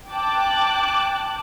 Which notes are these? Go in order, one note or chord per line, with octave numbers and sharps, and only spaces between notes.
G5 A5 D6 F#6